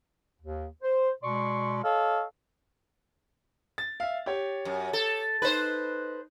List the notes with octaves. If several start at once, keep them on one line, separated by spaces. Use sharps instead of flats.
D#2
C5
B2 G#3 D5 C6 C#6
A4 C#5 D#5 F5
A6
E5 F5
G4 C#5
F#2
A4
D#4 B4 C5